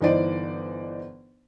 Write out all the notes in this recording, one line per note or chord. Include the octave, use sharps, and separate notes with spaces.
G1 E3 D#4 C5 D5